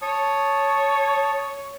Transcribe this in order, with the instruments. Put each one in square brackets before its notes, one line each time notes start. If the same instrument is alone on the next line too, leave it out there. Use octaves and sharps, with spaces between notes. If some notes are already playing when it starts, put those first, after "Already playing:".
[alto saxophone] C#5 [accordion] A5 D#6